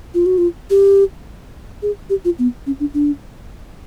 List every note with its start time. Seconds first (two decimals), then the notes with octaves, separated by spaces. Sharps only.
0.14 F4
0.26 F#4
0.38 F4
0.70 G4
1.82 G#4
2.10 G4
2.25 F4
2.39 B3
2.66 C#4
2.80 D4
2.94 D4